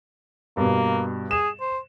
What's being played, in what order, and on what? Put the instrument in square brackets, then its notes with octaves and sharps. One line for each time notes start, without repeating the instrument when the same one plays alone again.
[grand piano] G2 B2 [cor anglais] A#3
[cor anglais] G#4 [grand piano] E7
[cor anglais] C5